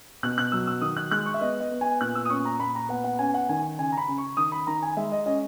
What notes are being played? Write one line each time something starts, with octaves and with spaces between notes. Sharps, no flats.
B2 F#6
F#6
F#3 E6
E6
D#3 D#6
F#6
G#3 F#6
C#6
E5
B3 D#5
D#5
B3
G#5
A#2 F#6
E6
D#6
C#4 C#6
A#5
A#2 B5
A#5
B3 F#5
F#5
C#4 G#5
F#5
D#3 G#5
C#3 G#5
A#5
B5
C#3
C#6
D#3 D#6
B5
D#3 A#5
G#5
G#3 E5
D#5
C#4 D#5